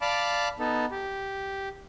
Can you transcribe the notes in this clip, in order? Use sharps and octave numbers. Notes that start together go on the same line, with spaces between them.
D5 F5 A5 B5 D6
B3 D#4 A4
G4